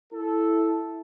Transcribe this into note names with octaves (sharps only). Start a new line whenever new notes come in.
E4 A4